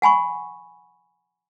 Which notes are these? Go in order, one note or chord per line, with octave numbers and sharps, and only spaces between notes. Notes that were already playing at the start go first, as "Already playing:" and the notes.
F#5 G#5 B5 C#6